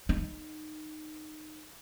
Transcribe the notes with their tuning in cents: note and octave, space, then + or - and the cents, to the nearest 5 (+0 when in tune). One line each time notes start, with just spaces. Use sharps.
D#4 -15